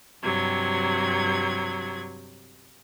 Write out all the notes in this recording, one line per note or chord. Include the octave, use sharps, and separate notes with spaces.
G2 C3 F#3 G#6